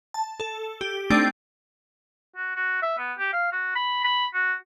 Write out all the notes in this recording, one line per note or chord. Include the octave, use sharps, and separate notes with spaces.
A5
A4
G4
A3 C4 D4 D#4 D5 G5
F#4
F#4
E5
B3
G4
F5
F#4
B5
B5
F#4